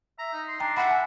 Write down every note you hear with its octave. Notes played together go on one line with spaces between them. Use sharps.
E5 A#5
D#4
C6
D4 G5 A#5
E5 F#5 B5
G#5